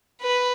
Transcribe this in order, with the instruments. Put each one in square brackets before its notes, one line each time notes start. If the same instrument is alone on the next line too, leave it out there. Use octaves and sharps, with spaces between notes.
[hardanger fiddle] B4